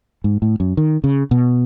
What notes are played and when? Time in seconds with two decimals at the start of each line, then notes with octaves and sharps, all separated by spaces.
0.24 G#2
0.42 A2
0.60 F#2
0.77 D#3
1.04 C#3
1.31 B2